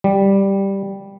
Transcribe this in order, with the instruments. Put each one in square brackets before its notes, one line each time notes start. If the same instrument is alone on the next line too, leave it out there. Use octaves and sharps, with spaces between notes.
[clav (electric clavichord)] G3